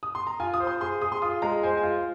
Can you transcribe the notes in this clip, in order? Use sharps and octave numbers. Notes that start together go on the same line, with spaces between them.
D#6
C6
A#5
F4 G#5
D#6
C5
C6
G#4 C6
G#4 D#6
C6
F4 D#6
G#3 A#5
C5 G#5
G#5
F4